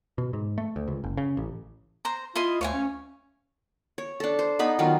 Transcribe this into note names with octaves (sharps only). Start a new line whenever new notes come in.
B2
G#2
A3
D2
C#2
F#1
C#3
A1
C5 A#5
E4 F4 D#5 C6
D2 C#5 F5 G#5
C#4
C#5
D4 A4
C5
B3 D#4 B5
D#3 F#3 B3 F4